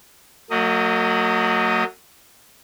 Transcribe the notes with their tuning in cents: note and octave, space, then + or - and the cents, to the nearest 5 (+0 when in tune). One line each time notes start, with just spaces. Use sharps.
F#3 -5 A#3 -45 D#5 +0